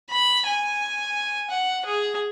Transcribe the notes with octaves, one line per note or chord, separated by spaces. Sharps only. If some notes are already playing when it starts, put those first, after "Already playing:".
B5
G#5
F#5
G#4